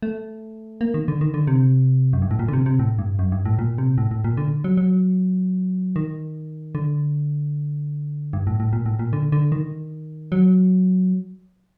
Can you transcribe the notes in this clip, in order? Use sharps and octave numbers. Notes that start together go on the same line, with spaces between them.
A3
A#3
D#3
D3
D#3
D3
C3
F#2
G2
A2
A#2
D3
C3
C3
A2
G2
F#2
G2
A2
A#2
C3
A2
A2
A#2
D3
F#3
F#3
D#3
D3
G2
A2
A2
A#2
A2
A#2
D3
D3
D#3
F#3